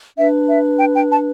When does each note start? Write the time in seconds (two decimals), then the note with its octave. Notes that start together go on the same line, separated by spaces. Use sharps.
0.17 D4 B4 E5
0.48 E5
0.79 G5
0.94 G5
1.11 A5